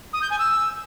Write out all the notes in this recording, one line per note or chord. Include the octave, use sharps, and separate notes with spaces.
D#6
G6
G#5
E6